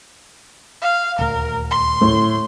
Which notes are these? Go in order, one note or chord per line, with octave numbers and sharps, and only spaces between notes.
F5
D#1 D2 A#4
C6
A2